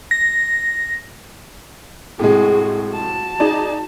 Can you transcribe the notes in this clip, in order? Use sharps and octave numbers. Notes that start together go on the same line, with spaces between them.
A#6
A2 C3 G#3 F#4 G#4
F#4 A5
D#4 G#4 D5